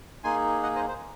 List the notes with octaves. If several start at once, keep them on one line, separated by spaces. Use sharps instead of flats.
A#3 D#4 G#4 G#5 C6
D#5 F#5
C5 D#5
C5